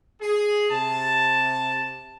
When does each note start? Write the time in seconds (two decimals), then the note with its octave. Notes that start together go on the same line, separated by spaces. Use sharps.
0.21 G#4
0.70 C3 A5